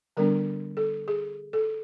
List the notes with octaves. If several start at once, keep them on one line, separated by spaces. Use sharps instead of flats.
D3 G3 B3 D4 A#4
A4
G#4
A4